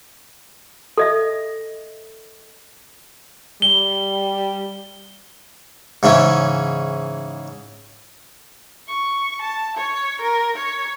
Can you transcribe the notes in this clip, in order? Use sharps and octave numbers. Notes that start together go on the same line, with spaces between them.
A4 D#5 E5
G3 G7
G#2 C#3 E3 C#4
C#6
A5
C#5
A#4
C#5